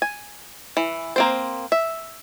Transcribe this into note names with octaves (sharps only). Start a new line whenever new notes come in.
G#5
E3
A#3 C4 C5
E5